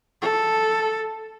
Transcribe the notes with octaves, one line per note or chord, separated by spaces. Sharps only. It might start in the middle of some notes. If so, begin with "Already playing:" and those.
A4